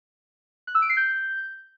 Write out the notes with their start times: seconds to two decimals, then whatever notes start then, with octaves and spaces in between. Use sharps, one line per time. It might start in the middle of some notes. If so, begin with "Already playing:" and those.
0.67 F#6
0.75 E6
0.82 D7
0.89 C7
0.97 G6